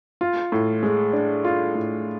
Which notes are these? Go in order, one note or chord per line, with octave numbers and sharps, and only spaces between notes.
F4
A2
G#3
D4
F4
A2